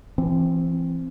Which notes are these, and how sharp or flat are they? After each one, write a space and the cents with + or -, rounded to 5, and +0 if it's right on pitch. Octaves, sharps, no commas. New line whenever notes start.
E3 +35 C4 +0